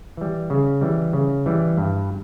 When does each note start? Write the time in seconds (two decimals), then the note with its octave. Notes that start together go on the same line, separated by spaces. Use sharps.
0.17 E3 G3
0.50 C#3
0.81 E3 G3
1.13 C#3
1.46 E3 G3
1.78 G2